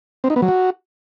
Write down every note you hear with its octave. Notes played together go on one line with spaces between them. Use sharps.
C4
D#4
B3
F#3
F#4